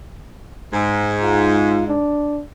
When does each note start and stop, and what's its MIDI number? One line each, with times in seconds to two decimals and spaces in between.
0.73 1.97 44
1.22 1.86 65
1.88 2.41 62